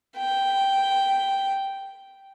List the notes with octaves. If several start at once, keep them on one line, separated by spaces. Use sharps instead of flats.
G5